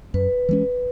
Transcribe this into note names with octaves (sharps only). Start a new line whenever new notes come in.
F#2 B4
E3 G#3 C#4